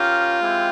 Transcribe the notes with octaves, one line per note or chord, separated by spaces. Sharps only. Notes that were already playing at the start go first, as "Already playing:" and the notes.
Already playing: C#4 F4 G4 A#4
G#3 C4 E4 G4